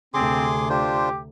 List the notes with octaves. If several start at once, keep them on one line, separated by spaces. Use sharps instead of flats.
D2 C3 C4 G#4 C6 D6
D4 F4 G4 C5